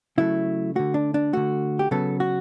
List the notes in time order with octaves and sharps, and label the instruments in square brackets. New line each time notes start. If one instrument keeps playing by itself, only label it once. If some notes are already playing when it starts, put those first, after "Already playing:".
[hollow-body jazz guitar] C#3 F#3 A3 E4
D3 A3 F#4
D4
D4
D3 A3 F#4
G4
C#3 F#3 B3 A4
F#4